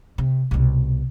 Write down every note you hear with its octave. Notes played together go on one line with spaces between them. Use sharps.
C3
C2 B2